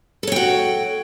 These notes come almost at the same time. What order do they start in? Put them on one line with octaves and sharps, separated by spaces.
A4 C#5 G5 F#4